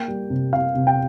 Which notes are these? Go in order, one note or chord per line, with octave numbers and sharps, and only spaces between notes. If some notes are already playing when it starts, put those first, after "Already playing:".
Already playing: A#3 G5
G3
C3
C3 F5
C3
G5